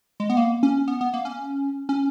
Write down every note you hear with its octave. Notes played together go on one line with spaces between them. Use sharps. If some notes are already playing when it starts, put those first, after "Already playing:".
G#3
B3
A#3
C#4
B3
B3
A#3
C#4
C#4